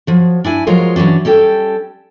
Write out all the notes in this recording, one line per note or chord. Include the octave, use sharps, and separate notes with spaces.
F3 F#3
D4 E4 G#5
F3 F#3 G#3 F4 A#4 C#5
E3 F#3 G3 C#4 D4
G3 C#4 A4 G5